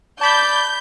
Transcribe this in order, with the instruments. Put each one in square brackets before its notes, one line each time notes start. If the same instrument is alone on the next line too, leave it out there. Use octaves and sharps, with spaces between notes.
[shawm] D5 [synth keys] A5 B5 B6 [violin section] G6